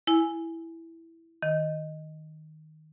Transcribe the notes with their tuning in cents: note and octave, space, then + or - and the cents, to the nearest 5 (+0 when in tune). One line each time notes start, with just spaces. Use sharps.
E4 +0 G#5 +0
D#3 +0 D#5 +0